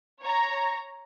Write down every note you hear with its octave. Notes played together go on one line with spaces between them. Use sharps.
C#5 A#5